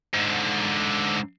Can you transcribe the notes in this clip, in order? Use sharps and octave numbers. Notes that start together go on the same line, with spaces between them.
G#2 D3